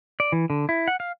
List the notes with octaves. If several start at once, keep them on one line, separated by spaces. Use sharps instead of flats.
D5
E3
D3
E4
F#5
F5